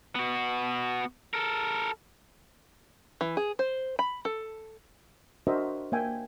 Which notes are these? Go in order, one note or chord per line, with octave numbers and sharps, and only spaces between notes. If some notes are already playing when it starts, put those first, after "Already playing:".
B3 F#4
A4 A#4
E3
G#4
C5
B5
A4
D4 F#4 A#4 C5 D#5 E5
A#3 D5 E5 F5 G5 G#5